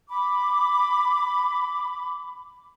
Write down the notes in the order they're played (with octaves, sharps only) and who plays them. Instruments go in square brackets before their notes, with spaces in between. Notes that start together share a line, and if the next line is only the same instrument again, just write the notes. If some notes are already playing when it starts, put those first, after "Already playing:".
[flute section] B5 D6